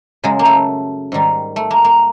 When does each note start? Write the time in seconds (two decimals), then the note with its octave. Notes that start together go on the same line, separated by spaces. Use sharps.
0.23 F#2 C#3 F#3 G#3
0.39 A#3
0.45 A3
1.12 G#2 D#3 G3
1.56 A3
1.71 A#3
1.84 A#3